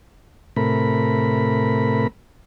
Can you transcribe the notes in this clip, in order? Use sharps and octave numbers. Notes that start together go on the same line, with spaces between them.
A2 C3 A3 A#4 B5